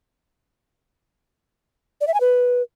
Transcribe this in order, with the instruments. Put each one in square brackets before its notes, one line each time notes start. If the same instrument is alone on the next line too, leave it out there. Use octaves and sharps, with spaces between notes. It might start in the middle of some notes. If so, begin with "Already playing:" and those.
[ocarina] D5
E5
G#5
B4